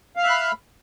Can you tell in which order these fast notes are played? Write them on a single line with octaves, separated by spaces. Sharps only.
F5 F6 E5 F#6 B5